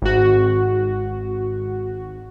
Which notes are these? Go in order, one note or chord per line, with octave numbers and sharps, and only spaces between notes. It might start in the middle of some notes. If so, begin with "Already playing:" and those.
G#1 F#4